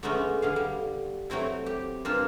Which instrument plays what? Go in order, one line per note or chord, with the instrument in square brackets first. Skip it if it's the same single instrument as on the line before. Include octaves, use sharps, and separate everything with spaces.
[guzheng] D3 F#3 G#3 A3 B3 C#4
D3 G#4 F5
G3
F#3 A3 C4 E4
G4
G2 A#3 C4 F4 F5 A5